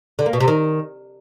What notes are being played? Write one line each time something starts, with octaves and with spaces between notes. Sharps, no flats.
D3
A#3
B2
C3
D#3